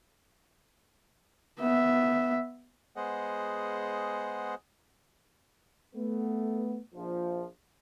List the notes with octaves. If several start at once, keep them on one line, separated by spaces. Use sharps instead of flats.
B3 E5
G#3 B3 G#4 C5 D#5 F#5
A3 B3
A#1 F3